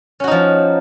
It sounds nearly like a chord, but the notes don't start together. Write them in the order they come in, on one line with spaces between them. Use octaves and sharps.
C#4 F#4 D#4 F3